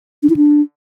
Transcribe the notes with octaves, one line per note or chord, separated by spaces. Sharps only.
D4
E4
D4